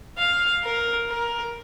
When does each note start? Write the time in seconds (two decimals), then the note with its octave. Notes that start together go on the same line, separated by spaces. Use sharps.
0.18 F5
0.63 A#4
1.09 A#4